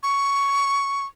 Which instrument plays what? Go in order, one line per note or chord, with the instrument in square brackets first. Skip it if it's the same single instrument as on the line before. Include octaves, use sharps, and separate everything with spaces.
[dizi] C#6